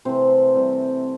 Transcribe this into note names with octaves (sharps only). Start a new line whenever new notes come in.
C3 E3 A3 C4 C5
C3 E3 G3